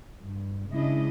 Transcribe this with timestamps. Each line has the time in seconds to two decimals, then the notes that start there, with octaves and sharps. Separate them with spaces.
0.21 G2
0.70 C#3 G#3 D4 E4 D#5